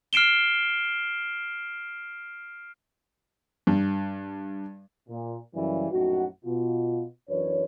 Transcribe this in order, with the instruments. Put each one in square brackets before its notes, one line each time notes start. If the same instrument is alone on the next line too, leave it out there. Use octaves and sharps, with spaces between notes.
[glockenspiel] F6 C7 D7 E7 G7
[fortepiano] G2
[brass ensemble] A#2
F#2 C#3 E3 G3
A#1 F#2 A2 D#4 F#4
B2 F4
F#2 E3 D4 B4 C#5